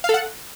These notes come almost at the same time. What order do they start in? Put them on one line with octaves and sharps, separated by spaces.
F5 A4 F#5